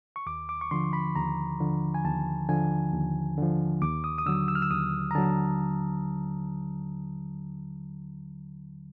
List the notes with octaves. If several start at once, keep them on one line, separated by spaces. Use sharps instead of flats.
C#6
D#2 D6
D6
C#6
D3 F3 C6
B5
D#2 A#5
D3 F3
G#5
D#2 A5
D3 F3 G#5
D#2
D3 F3
D#2 D6
D#6
D#6
D3 F#3 E6
E6
F6
E6
D#2 D#6
A#5
D3 F#3 A5